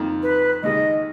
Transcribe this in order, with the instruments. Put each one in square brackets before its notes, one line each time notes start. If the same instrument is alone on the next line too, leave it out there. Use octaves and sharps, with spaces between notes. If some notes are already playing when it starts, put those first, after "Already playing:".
Already playing: [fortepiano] F2 D#3 A#3 D#4
[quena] B4
[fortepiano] D#2 D#3 G#3 [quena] D#5